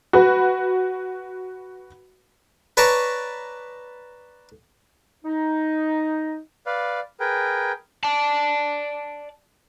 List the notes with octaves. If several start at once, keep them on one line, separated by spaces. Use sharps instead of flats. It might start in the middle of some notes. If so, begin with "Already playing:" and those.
F#4 B4
B4 C#5 D5 A5 A#5 C#6
D#4
B4 D5 F5
G#4 A#4 B4 G5
D5 A5